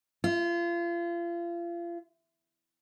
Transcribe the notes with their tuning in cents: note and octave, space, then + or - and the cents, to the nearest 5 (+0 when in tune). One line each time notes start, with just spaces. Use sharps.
F4 -35